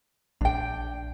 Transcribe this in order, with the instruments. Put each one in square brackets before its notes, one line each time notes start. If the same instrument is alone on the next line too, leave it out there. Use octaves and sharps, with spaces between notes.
[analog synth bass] A#1 [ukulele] D4 G5